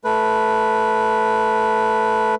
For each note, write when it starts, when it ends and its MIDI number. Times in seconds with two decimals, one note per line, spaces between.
0.04 2.35 57
0.04 2.35 71